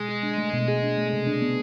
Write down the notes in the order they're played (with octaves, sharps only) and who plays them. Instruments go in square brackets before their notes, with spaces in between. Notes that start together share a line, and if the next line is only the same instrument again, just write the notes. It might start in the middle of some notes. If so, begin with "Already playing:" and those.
Already playing: [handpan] B2 [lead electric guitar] G#3
[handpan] G#4
D4
A3
B2
G#4
D4
A3
C3
D4
B3